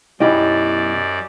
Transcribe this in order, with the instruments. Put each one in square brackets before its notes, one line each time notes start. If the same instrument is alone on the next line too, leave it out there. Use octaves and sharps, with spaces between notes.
[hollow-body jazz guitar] B1 E4 B5 [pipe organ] F#2 D5 [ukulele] C#4 G4 D#5